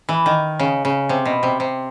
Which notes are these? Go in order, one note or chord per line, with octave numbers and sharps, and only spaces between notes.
E3
D#3
C#3
C#3
C3
B2
C3
C3